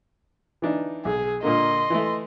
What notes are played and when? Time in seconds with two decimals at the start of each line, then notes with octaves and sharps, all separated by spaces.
0.62 E3 D4 D#4
1.05 B1 G#4
1.43 A#2 D3 A#3 D#5 C6
1.90 E3 A3